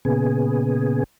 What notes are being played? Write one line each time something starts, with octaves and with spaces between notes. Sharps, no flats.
A#2 C#3 B3 G#4